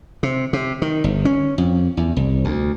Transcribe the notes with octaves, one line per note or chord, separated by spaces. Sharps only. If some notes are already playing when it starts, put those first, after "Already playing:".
C3
C3
D#3
G1
C#4
F2
E2
C2
D2